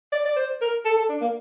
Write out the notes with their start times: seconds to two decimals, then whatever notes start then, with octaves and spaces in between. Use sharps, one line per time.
0.12 D5
0.25 D5
0.36 C5
0.61 A#4
0.85 A4
0.97 A4
1.09 D4
1.21 A#3